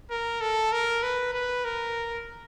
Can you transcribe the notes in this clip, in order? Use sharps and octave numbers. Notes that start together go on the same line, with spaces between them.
A#4
A4
A#4
B4
B4
A#4